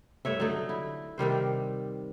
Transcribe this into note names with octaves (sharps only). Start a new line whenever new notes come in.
G2 A3 C#5 E5
D3 F#3 A3 D#4
E4
C3 D#3 G3 C5